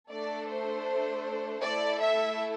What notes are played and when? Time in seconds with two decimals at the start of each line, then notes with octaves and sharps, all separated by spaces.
0.11 A3 D4 A4 D5
0.48 C5
1.61 A3 E4 A4 D5
2.00 E5